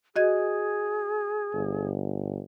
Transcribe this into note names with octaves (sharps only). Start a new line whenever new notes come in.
F#4 G#4 D#5 G#6
G1